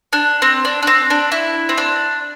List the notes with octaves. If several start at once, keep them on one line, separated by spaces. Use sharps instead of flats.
D4
C4
D4
D4
C4
D4
E4
C4
D4